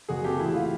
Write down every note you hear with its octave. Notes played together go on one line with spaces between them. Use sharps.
F#1 F#4 G#4
C3 G4 A4
A1 E4
F4